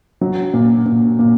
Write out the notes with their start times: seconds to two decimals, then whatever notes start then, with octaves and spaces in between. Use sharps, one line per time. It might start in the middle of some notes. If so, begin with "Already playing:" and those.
0.21 F#3
0.54 A#2
0.86 A#2
1.19 A#2